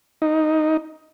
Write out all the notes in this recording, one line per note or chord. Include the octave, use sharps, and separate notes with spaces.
D#4